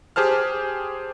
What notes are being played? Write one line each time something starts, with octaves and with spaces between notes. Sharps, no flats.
G4 G#4 C5 A5 F6